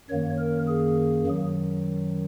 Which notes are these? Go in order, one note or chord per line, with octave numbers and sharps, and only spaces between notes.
F#2 D#3 A#3 C#5
A#4
G#4
F#2 D#3 F#3